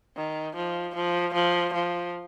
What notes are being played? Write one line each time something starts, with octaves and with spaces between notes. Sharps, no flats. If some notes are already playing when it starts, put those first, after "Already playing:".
D#3
F3
F3
F3
F3